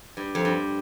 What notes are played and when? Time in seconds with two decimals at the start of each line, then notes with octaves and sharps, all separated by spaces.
0.17 G2
0.35 F2
0.45 G2